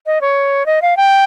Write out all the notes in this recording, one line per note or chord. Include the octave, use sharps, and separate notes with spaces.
D#5
C#5
D#5
F5
G5